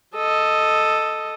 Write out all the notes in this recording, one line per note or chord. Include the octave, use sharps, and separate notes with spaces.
A4 D#5